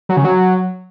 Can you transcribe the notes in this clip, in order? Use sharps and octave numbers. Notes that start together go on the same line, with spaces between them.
F#3
C#3
F#3